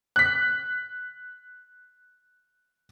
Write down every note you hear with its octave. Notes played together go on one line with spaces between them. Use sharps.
F#6 B6